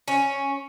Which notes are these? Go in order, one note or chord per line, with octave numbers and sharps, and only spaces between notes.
C#4